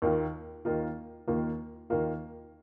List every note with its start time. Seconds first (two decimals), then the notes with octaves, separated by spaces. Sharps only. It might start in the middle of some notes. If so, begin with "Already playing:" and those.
0.02 D#2 D#3 A#3 F4
0.65 D#2 D#3 A#3 F4
1.27 D#2 D#3 A#3 F4
1.90 D#2 D#3 A#3 F4